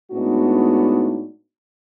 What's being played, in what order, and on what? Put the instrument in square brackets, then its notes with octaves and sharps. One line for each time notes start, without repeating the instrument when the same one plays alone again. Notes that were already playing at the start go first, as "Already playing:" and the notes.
[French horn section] A2 G#3 B3 D4 D#4 F#4